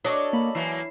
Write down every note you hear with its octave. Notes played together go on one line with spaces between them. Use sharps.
D4 F#4 A4 C#5 D#5
A#3 B5
E3 F#3 A#3 E4 C7